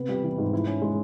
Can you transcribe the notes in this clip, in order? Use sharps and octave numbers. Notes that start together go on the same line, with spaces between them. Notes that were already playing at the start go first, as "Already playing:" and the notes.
Already playing: C3 B3
G3
E3
G#2
E4
C#4
G#3